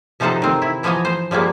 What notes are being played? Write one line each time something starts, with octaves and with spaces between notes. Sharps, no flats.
C3 F3 D#4 A4 C5 F#5
D#3 C4
E4
E3 F3 B3 D#5 G#5 A#5
C5
F3 G3 G#3 A#3 B3